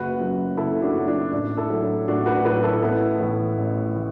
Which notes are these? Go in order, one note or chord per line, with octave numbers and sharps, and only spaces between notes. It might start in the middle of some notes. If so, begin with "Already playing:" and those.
Already playing: F#1 F#4 B4
F#2 F#3
F#1 E4 A4
D4 F#4
F#2 F#3
D4 F#4
A1 D4
E4 A4
A2 F#3
D4
A1 D4 F#4
F#4 B4
A2 F#3 F#4 B4
E4 A4
A1 B3 E4
A2 E3
A1
E3